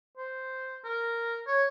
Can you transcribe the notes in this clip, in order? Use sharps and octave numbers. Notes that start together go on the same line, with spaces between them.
C5
A#4
C#5